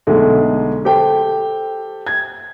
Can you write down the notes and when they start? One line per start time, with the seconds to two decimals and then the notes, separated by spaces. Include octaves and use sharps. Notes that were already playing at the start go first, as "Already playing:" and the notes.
0.07 B1 D3 G#3 A3
0.85 G4 A4 C5 G5
2.07 G#6